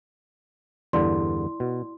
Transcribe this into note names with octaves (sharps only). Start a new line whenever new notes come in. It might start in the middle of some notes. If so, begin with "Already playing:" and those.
E2 G2 D3 E4 D5 C6
B2